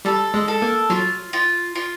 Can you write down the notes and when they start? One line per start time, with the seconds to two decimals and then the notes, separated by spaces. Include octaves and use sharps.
0.05 G3 A4
0.34 G#3
0.48 A4
0.62 A#3
0.90 F#3 F4
1.33 F4
1.75 F4